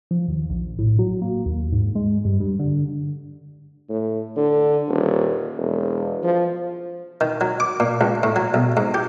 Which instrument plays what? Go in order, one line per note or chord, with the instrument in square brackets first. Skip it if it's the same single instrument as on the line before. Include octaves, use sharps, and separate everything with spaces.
[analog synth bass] F3
D#2
A#1
A2
F#3
A#3
D#2
G#2
G#3
G2
G2
D3
[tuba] A2
D3
D#1
E1
F3
[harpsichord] D#3
F#3
D6
A#2
C#2
A2
F#3
B1
G#2
G4